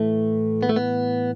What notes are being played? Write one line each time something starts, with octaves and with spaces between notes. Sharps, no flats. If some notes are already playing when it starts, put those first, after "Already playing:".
Already playing: A2 E3 A3
B3
A3
B3